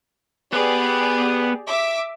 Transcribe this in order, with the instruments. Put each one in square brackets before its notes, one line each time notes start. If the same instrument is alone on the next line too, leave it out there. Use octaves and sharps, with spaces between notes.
[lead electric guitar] B3 B4 [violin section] G4 G#4 D5
[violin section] E5 D6